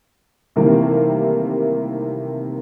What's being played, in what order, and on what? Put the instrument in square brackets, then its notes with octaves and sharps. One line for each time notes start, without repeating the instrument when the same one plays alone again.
[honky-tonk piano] C3 D#3 E3 G3 A3 A#3